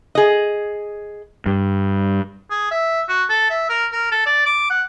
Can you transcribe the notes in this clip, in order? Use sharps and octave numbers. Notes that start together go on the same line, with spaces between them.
G#4 D#5
G2
G#4
E5
F#4
A4
E5
A#4
A#4
A4
D5
D6
F#5